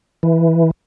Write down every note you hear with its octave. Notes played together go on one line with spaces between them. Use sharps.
E3